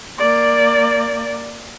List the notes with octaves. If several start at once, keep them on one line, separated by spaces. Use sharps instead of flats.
A#3 D5